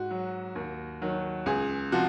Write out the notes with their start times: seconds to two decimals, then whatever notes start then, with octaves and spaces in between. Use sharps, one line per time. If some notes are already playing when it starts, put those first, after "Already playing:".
Already playing: G#2 F#4
0.11 F#3
0.55 D#2
1.01 D#3 F#3
1.46 C#2 G#4
1.92 C3 F3 F#4